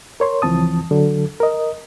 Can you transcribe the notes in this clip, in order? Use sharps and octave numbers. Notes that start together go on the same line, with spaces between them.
A#4 C#5 C6
C#2 E3 F3 C4 A5 D#6
D3 F#3 A4
A#4 D#5